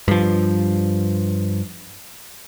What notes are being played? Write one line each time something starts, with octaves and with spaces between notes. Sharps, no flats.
G2 F3